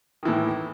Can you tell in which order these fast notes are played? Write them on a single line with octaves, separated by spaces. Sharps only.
D#3 E3 A2